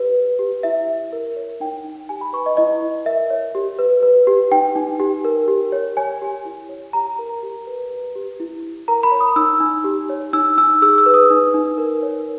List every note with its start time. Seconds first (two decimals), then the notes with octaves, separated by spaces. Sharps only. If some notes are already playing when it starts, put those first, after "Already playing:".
Already playing: G4 B4
0.15 B4
0.39 G4
0.63 E4 E5
0.88 E4
1.13 A#4
1.36 C#5
1.60 D#4 G5
1.84 D#4
2.09 G4 G#5
2.21 B5
2.33 B4 C#6
2.46 D#5
2.57 E4 D#5
2.82 E4
3.06 A#4 E5
3.30 C#5
3.55 G4
3.79 B4
4.03 B4
4.27 G4
4.51 D#4 G5
4.75 D#4
5.00 G4
5.25 A#4
5.48 G4
5.72 C#5
5.97 C#5 G#5
6.22 G4
6.45 E4
6.69 C#5
6.93 G4 A#5
7.19 A#4
7.43 G4
7.67 B4
7.91 B4
8.16 G4
8.40 E4
8.63 E4
8.88 A#4 A#5
9.03 B5
9.12 C#5
9.20 D#6
9.36 D#4 E6
9.60 D#4
9.84 G4
10.09 C#5
10.33 D#4 E6
10.58 D#4 E6
10.82 G#4 E6
10.98 E6
11.06 B4
11.14 D#6
11.30 D#4
11.54 D#4
11.78 A#4
12.03 C#5